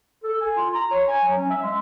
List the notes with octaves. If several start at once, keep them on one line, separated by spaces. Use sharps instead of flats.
A4
G#5
F4
A#5
C#5
G#5
F#3
C#4
E5
G#3